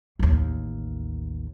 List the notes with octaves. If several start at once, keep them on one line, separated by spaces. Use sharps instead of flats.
A1 D#2